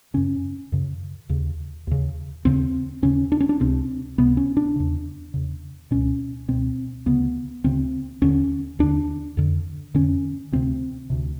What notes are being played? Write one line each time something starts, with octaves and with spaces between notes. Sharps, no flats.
F#2 C#3 C#4
F#2 C#3
D#2 C#3
D#2 C#3
D#2 C#3 C4
D#2 C#3 C#4
D4
C#4
D4
C#2 C3 C4
C#2 C3 B3
C#4
D4
E2 C#3
E2 C#3
C#2 B2 C#4
C#2 B2 C4
D2 C#3 B3
D2 C#3 C4
D#2 D3 C#4
D#2 D3 D4
F2 D3
F2 D3 C#4
D2 C3 C4
D2 C3